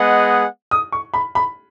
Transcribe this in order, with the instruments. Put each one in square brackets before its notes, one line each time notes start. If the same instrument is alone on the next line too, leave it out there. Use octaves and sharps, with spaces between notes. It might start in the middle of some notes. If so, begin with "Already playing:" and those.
Already playing: [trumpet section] G#3 B3 G#4 D#5 F#5
[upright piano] D#6
C#6
B5
B5